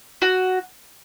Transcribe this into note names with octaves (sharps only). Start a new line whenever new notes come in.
F#4